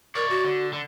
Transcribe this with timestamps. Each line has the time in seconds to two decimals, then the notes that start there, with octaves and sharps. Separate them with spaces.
0.15 A#4 C#5 D5
0.30 F#4
0.45 D3
0.73 D3